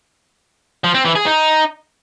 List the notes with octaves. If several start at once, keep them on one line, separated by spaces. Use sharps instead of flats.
F3
C4
E3
G#4
D#4